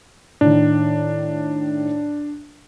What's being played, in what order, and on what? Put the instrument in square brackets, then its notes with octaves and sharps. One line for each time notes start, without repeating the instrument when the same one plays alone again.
[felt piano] A2 D#3 [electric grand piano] D4